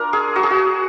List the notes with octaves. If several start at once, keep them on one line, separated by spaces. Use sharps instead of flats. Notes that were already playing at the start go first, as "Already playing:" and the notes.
Already playing: D4 F4 A#4
G#4
F#4
G#4
F#4